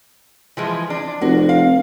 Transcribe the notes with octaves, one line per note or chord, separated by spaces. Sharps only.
E3 F3 G#3
D4
F1 F#4
F5